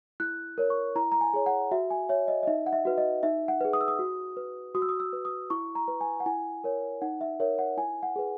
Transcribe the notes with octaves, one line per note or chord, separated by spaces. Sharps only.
E4 F#6
A#4 C#5
C#6
E4 A#5
A#5
G#5
G#4 C#5
F#5
F#4 E5
G#5
C#5 E5
D#5
D#5
D#4 E5
F#5
E5
F#4 B4
D#5
D#4 E5
F#5
G#4 B4
D#6
E6
D#6
F#4
B4
F#4 D#6
E6
D#6
E6
B4
D#6
E4 C#6
A#5
B4
G#5
F#5
E4 G#5
A#4 C#5
D#4 F#5
E5
A#4 C#5 E5
F#5
E4 G#5
F#5
G#4 B4